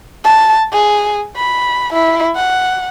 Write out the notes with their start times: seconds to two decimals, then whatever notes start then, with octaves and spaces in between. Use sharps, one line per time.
0.24 A5
0.73 G#4
1.36 B5
1.94 E4
2.36 F#5